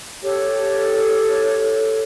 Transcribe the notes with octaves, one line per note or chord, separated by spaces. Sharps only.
G4 A4 C#5